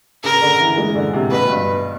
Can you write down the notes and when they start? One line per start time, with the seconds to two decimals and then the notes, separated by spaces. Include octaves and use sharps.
0.24 C#3 A#4
0.42 D3
0.60 E3
0.77 G#3
0.95 D3
1.13 C3
1.31 B2 B4
1.49 G2